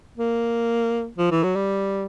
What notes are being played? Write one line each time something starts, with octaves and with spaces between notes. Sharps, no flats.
A#3
F3
E3
F#3
G3